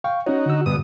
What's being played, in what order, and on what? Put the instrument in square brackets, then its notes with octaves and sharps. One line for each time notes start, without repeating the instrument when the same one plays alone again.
[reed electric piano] F5 G5 C#6
[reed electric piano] C#4 C#5 [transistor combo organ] D#4 F#4
[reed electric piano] D3 E6
[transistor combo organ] G2 B2 D#6